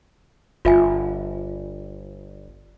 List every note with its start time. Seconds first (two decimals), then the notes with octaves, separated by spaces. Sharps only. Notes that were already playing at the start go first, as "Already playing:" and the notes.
0.65 G1 F4 E5 G#5